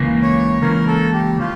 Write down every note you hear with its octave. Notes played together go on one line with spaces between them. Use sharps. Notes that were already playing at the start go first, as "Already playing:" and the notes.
Already playing: C#2 C#3 E3 A#3
C#5
C#2 C#3 E3 A#3 A#4
A4
G4
C#3 F3 F4